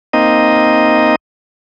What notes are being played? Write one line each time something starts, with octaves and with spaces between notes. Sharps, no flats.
A#3 C4 D#4 D#5